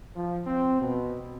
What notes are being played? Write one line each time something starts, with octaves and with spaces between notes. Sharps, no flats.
F3
C4
B2